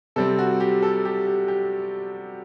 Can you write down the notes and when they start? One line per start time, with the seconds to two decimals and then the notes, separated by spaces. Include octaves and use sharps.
0.16 C3 G3 C4 A4
0.39 F#4
0.60 G4
0.82 A4
1.05 G4
1.27 G4
1.48 G4